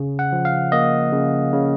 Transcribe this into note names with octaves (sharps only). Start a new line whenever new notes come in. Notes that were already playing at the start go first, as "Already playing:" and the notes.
Already playing: C#3
F#5
F3
F5
A#3 D#5
C#3
C#3